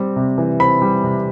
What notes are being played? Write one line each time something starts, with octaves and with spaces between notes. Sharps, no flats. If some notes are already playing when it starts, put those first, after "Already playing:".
Already playing: G3 C4
C3
E3
C4 B5
G3
C3